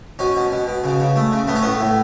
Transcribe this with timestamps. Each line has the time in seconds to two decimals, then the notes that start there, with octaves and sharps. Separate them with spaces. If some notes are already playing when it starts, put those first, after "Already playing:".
0.19 B2 C#4
0.36 B2
0.52 B2
0.67 B2
0.84 C#3
1.00 C#3
1.16 A3
1.32 C#3
1.47 A3 B3
1.55 C#4
1.62 A2 B3
1.80 A2